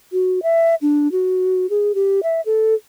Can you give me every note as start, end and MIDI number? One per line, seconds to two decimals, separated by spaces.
0.12 0.40 66
0.43 0.75 76
0.82 1.11 62
1.12 1.66 66
1.70 1.95 68
1.95 2.20 67
2.23 2.41 76
2.46 2.75 69